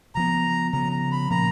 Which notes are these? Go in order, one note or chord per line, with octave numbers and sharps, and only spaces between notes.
C#3 F3 B3 A#5
C#3 F3 B3 A#5
A#5
B5
A#2 F3 A#3 C#4 A#5